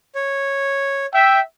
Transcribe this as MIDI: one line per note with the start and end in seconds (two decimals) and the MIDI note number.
0.15 1.06 73
1.14 1.39 76
1.14 1.41 79